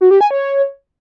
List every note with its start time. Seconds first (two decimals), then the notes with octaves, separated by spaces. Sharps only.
0.01 F#4
0.11 G4
0.21 G#5
0.31 C#5